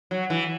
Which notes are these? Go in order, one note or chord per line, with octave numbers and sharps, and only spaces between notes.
F#3
E3